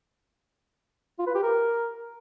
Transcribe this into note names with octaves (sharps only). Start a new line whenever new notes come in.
F4
B4
G4
A#4